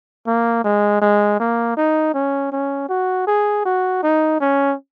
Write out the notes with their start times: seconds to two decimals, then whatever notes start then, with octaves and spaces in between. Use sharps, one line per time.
0.27 A#3
0.64 G#3
1.02 G#3
1.40 A#3
1.77 D#4
2.14 C#4
2.52 C#4
2.89 F#4
3.27 G#4
3.65 F#4
4.03 D#4
4.40 C#4